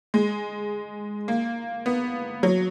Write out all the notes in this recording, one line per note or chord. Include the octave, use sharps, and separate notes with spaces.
G#3
A#3
B3
F#3